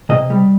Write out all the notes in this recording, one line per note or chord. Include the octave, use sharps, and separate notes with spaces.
C3 D#5
G3